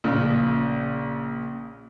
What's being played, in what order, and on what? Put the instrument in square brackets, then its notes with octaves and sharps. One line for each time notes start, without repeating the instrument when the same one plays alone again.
[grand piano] A#1 A#2 C#3